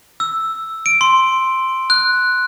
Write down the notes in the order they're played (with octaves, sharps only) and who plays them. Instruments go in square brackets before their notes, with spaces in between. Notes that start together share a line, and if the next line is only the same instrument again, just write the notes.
[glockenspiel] E6
D7
C6
F#6